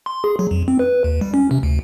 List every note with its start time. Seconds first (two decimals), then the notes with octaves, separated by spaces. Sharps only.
0.06 C6
0.24 G#4
0.39 F#3
0.51 F2
0.68 C4
0.79 B4
1.04 D#2
1.21 G3
1.34 C#4
1.51 C3
1.63 D2